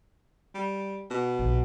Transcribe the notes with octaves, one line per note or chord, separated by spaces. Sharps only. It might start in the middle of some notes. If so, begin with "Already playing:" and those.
G3
B2
A#1